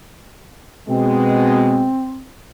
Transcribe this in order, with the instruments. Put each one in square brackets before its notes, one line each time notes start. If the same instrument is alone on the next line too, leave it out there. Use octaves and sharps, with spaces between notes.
[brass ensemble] B2 G#3 [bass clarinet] C4